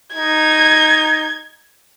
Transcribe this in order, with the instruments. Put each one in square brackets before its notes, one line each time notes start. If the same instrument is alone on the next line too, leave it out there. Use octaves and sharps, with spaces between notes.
[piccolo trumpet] D#4 [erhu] G#6